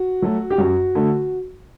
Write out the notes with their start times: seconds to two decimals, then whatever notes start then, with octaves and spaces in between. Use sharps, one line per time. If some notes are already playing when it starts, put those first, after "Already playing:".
Already playing: F#4
0.22 F#3 A3
0.50 G4
0.58 F#2 F#4
0.95 D3 A3